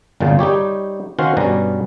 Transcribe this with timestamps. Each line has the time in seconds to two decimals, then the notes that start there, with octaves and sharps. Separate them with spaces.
0.20 G1 A#2 C#3 G#3 A5
0.39 G3 D#4 G4 C#5
1.19 D#3 C#4 F#4 C5 F5
1.37 G2 B2 G3 C#4 A#5